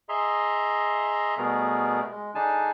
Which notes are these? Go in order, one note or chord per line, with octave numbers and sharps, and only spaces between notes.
G#4 D#5 E5 A#5 C6
B2 G3 A3 B3 G#4 A#4
G#3
D3 D4 D#4 G#4 G#5 A5